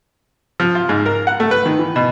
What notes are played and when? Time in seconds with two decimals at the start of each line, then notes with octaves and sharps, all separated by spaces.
0.60 F3
0.75 F4
0.89 G#2
1.06 A#4
1.27 F#5
1.40 A3
1.51 B4
1.66 D#3
1.79 E3
1.96 B2